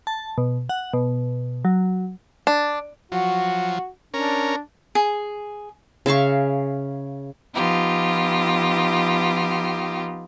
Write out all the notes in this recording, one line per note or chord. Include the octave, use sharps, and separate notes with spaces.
A5
B2
F#5
B2
F#3
D4
F3 F#3 F#4
C#4 D4 A#4
G#4
C#3 E5 F5 C#6
F3 B3 D#4 F4 G4